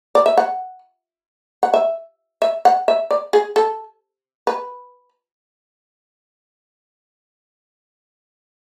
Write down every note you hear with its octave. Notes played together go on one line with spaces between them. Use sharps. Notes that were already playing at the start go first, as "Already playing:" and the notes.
D5
E5
F#5
F#5
E5
E5
F#5
E5
D5
G#4
A4
B4